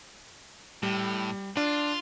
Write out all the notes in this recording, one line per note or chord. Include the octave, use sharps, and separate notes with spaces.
A2 G3
D4 F4